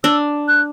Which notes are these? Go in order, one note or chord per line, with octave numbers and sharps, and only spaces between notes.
D4 E6
F#6